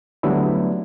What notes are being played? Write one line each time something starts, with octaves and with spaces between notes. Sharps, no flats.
D3 F#3 G3 A3 B3 E4